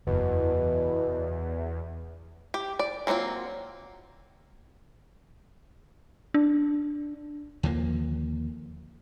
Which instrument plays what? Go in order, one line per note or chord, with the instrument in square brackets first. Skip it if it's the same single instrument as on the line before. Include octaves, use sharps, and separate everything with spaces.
[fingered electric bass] F#1 [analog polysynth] E2 [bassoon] B2
[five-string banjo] G4
D5
F#3 A#3 C4 D#4 F4
[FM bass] D4
[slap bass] D#2 D3 F3 A#3